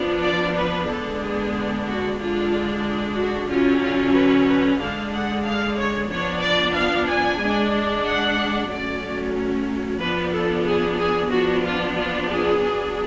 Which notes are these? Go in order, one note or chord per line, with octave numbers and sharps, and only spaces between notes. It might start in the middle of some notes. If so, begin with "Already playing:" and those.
Already playing: F3 B3 D4
D5
B4
D3 G#3 B3 D4 A4
G#4
F#4
D3 G#3 D4 F4
F#4
D3 F#3 C#4 F4
F4
B4
B4
D3 G#3 D4 F5
F#5
F5
C#5
F3 B3 D4 C#5
D5
F5
G#5
G#3 D4
F#5
F#3 A3 C#4 D5
F3 B3 D4 B4
A4
G#4
G#4
F3 B3 D4 F#4
F4
F4
G#4
F#3 B3 D4